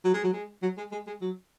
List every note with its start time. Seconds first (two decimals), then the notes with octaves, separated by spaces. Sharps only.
0.04 F#3
0.14 G#3
0.24 F#3
0.33 G#3
0.62 F#3
0.78 G#3
0.92 G#3
1.07 G#3
1.21 F#3